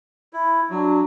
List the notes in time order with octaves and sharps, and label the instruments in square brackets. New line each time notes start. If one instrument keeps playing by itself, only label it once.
[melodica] E4
[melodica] F#3 [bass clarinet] D4